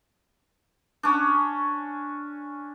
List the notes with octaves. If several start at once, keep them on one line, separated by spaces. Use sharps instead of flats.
C#4 D4